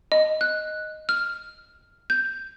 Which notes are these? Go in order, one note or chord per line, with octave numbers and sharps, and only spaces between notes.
D#5
F#6
F6
G6